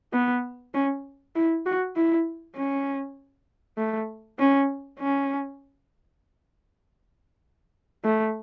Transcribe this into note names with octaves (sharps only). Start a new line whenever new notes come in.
B3
C#4
E4
F#4
E4
C#4
A3
C#4
C#4
A3